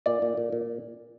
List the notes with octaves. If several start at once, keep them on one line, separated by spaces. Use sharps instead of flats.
A#2 D5
A#2
A#2
A#2